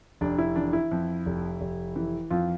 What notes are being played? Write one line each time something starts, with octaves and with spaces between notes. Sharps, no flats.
F1 D4
E4
E3 D4
E4
F2
F1
F1
E3
F2 F4